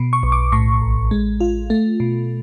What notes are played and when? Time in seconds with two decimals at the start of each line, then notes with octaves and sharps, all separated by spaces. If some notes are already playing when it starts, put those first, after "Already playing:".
Already playing: B2
0.13 C#6
0.23 B1
0.32 D6
0.52 A2 C#6
0.82 A1
1.11 G#3
1.41 F4
1.70 A3
2.00 B2